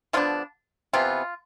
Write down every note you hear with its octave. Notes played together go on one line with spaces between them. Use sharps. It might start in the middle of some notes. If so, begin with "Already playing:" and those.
D3 F3 B3 D4 F4
C3 E3 B3 F4